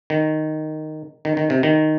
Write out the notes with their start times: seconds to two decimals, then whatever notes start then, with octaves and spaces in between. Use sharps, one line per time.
0.10 D#3
1.25 D#3
1.37 D#3
1.50 C3
1.63 D#3